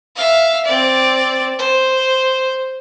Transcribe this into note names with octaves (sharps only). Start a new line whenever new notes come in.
E5 F5
C4 D5
C5